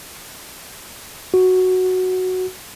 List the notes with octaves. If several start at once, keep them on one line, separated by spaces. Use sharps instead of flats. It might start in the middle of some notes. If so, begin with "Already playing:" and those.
F#4